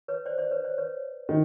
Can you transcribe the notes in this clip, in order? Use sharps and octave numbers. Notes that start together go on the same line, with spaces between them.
B4 C#5
C5 D5
C5 D5
B4 C#5
C5 D5
B4 C#5
D#3